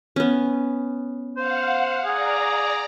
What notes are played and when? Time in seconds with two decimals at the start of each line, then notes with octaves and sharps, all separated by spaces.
0.16 B3 C#4
1.37 C5 F5 F#5
2.05 G#4 D5 A#5